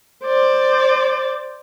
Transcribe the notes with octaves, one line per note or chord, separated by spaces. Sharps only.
C5 D5